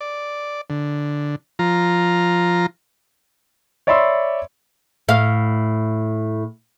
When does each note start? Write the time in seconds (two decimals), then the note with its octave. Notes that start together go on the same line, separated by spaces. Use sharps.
0.01 D5
0.70 D3
1.59 F3 F4 A#5
3.87 C#5 D5 E5 B5 C6 E6
5.09 A2 F5